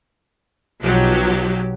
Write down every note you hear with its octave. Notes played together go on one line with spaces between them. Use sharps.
B1 B2 F3 F#3 G4